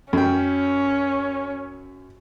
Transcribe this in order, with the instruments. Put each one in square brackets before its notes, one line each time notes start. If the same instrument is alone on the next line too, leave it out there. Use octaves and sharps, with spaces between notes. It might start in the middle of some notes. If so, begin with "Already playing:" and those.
[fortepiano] F#2 G5 [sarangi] C#4